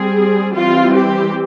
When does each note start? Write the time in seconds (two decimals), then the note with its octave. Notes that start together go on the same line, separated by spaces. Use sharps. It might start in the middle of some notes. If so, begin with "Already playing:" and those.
Already playing: G3 C4 G#4
0.55 E3 G3 C4 F4
0.94 G4